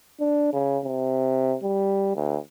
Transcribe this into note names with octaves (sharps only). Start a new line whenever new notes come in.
D4
C#3
C3
G3
D2